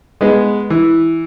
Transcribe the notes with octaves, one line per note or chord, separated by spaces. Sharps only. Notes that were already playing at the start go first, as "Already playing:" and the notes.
G#3 B3
E3